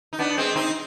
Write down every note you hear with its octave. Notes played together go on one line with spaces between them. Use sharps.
D#4
B3 D4
G#3 C4
C4 D#4